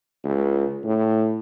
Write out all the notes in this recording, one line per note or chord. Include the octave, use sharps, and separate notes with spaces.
C#2
A2